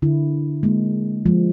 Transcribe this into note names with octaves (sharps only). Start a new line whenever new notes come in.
D3 E4
G#3 A#3
F3 G#3